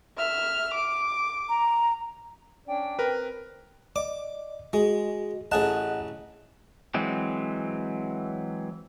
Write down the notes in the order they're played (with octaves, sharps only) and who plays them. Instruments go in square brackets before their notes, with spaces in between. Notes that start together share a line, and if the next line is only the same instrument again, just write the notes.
[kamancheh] E5 F6
D6
[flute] A#5
[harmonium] C#4 D4 D5 [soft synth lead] G5
[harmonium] C4 [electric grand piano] A#4 B4
[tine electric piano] D5 D#5 [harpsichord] D6
[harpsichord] G#3 [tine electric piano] F#4 D#5
[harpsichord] A1 G#4 A5 [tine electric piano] D#5 F#5 F#6
[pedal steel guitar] E3 F#3 G#3 C4